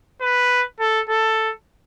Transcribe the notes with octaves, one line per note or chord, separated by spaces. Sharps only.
B4
A4
A4